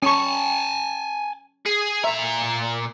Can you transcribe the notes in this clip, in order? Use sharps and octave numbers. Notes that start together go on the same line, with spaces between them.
C#4 G#5 A5 C#6
G#4
A#2 E5 A#5